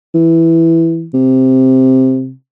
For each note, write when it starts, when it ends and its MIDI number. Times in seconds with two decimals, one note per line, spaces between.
0.15 1.07 52
1.14 2.32 48